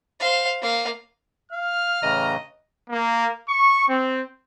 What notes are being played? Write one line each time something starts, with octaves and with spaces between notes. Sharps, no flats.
C5 F5
A#3 F5
F5 F6
A2 C#3 E3 D#5 A#5
A#3
C#6
C4